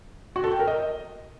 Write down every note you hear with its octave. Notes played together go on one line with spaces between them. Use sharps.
F#4
A4
G5
A#4
D#5